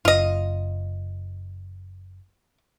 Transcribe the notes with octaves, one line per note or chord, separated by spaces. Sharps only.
F#1 F4 D#5